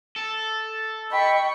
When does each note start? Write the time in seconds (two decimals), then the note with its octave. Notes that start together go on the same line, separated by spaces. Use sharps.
0.16 A4
1.11 D#5 G5 B5 C#6